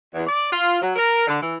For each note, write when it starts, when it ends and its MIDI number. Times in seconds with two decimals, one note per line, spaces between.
0.13 0.22 40
0.27 0.49 74
0.51 0.80 65
0.81 0.92 54
0.96 1.26 70
1.27 1.38 50
1.41 1.54 52